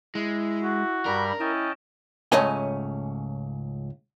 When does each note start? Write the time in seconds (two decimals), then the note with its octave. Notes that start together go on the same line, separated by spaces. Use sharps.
0.15 G#3 E4
0.63 F#4
1.06 G2 G3 A#4 B5
1.40 C#4 E4 D#5 G5 A5
2.32 C#2 G#2 A3 C#4 D#5 G#5